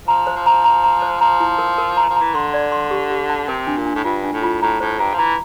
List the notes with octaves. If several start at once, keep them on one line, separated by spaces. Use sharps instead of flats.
F3 A#5
C5
F3
A#5
A#5
A#5
C5
F3 A#5
E4
A#4
A#4
A#5
F3
A#5
E3
D3 C6
D5
C6
G4
G4
A5
C3 A#4
D4
A#2
D4
A2
G2 F4
D4
A2
F4
A2 A#5
A2 C5
G2 A#5
F3
E3 A#5